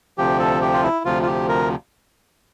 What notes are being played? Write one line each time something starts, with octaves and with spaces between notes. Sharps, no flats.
D2 C3 F3 G4
A4
G4
F4
E4
D2 C3 F3 F4
F4
G4
A#4